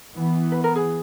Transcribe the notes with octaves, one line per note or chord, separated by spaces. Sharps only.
E3 B3
B4
A#4
G#4